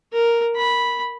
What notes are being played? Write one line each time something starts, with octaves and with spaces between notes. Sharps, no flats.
A#4
B5